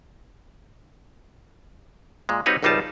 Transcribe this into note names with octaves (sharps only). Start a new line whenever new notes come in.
A#2 G#3
G3 C4 D#4 F#4 B4 C#5
G#1 C#2 G3 D#4 F4 A5